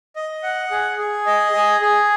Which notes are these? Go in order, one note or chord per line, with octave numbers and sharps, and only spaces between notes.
D#5
F#5
G#4
G#4
D#5
G#4
G#4